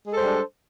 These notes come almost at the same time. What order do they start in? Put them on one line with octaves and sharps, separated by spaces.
G#3 A4 C5 G3 D4